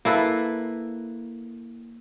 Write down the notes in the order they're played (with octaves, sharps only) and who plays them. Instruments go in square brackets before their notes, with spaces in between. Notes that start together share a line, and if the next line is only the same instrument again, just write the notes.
[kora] A#3 E4 A4 B4